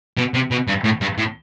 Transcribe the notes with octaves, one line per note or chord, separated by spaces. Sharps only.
B2
C3
B2
G2
A2
G2
A2